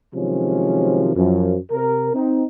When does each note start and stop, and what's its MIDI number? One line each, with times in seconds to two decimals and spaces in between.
0.14 1.12 48
0.14 1.12 51
0.14 1.12 53
0.14 1.12 54
0.14 1.12 56
0.14 1.12 61
1.16 1.56 42
1.16 1.56 53
1.71 2.10 48
1.71 2.10 70
2.14 2.44 60
2.14 2.44 63